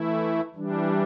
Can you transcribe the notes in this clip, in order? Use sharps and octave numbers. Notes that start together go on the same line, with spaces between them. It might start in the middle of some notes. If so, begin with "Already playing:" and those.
Already playing: E3 A3 E4
E3 G3 D4